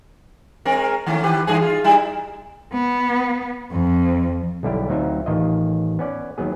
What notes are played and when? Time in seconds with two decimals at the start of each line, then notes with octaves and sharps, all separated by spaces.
0.65 G#3 C4 A#4
1.06 D#3 A3 C#4
1.23 D#3 G4 B4
1.47 G2 E3 G#4
1.62 F4
1.84 G3 D#4 E4
2.73 B3
3.72 F2
4.63 B1 D3 G3 E4 G4
4.89 D2 F#3 C4 D#4 F4 E5
5.26 A1 D#3 F4 D#5
5.99 B3 C#4 D5
6.38 D#2 F#3 B3 G#4